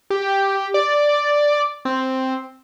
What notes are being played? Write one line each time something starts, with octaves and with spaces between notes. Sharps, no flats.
G4
D5
C4